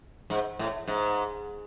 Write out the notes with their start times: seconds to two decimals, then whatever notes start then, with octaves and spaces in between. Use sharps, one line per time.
0.30 G#2
0.59 A2
0.88 G#2